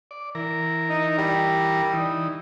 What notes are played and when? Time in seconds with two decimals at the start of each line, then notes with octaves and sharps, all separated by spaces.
0.11 D5
0.35 E3 A#4
0.90 D#4
1.18 G3
1.94 E3 D#4